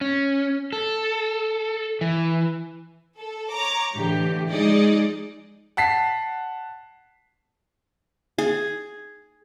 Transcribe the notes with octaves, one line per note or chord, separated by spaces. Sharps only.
C#4
A4
E3
A4
C#5 A#5 D6
A2 D3 E3 G4
F3 G#3 D#4 G#4 D5 D#5
F#5 A5 B6 C7
G#4